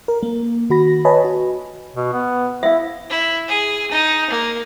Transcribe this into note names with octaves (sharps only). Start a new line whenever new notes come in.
A#4
A#3
D#3 F#4 B5 A#6
B4 C#5 D#5 G#5 A5 B5
F#4
B2
B3
E4 E5 F5
E4
G#4
D#4
A#3